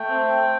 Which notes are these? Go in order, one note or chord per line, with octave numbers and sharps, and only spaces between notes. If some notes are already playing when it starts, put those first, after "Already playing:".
Already playing: A3 G5
C4